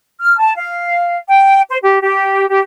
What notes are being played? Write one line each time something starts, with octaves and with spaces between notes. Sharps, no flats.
F6
A5
F5
G5
C5
G4
G4
G4